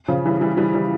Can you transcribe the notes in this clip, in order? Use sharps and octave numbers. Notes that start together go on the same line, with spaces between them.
C#3 F3
E3 G3
E3 G3
E3 G3
E3 G3